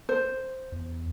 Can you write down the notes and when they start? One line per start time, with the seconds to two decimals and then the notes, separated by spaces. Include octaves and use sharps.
0.09 C5
0.72 E2